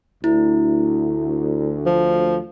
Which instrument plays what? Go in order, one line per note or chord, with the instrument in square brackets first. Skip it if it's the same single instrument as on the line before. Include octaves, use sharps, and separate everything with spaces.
[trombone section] D2 [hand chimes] E4
[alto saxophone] F3